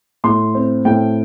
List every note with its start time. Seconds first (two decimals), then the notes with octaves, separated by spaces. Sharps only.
0.24 A2 C6
0.55 C4
0.85 A2 G5